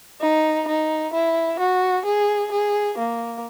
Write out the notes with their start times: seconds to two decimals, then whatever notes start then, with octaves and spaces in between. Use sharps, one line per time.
0.21 D#4
0.68 D#4
1.13 E4
1.59 F#4
2.05 G#4
2.52 G#4
2.98 A#3